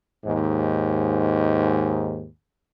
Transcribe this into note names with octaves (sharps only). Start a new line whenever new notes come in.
D#2 G#2